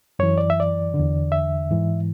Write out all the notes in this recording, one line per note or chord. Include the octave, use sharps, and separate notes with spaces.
F#2 E3 C#5
D5
E5
D5
D3
E2
E5
G#2 E3